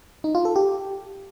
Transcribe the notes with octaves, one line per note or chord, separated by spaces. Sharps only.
D#4
F4
A4
G4